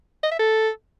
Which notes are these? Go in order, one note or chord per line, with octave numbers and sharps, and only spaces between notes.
D#5
E5
A4